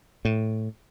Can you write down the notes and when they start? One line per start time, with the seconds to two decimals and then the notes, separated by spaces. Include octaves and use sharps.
0.25 A2